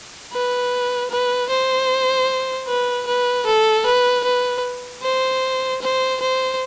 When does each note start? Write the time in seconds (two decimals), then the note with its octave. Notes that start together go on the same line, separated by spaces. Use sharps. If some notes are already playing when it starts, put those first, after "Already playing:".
0.33 B4
1.11 B4
1.50 C5
2.68 B4
3.07 B4
3.46 A4
3.86 B4
4.24 B4
5.03 C5
5.82 C5
6.20 C5